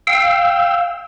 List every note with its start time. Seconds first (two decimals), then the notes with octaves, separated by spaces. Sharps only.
0.07 F5 G5 E6